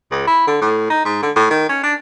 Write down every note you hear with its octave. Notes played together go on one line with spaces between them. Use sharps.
C#2
E4
D3
A2
D#4
G#2
D3
A2
D#3
C#4
D4